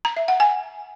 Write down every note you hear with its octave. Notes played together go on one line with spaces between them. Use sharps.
A#5
E5
F#5
G#5